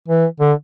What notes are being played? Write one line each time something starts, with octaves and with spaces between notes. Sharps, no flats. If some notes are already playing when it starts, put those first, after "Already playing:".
E3
D3